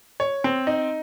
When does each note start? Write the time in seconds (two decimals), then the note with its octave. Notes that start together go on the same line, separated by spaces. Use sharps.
0.20 C#5
0.44 C4
0.67 D#4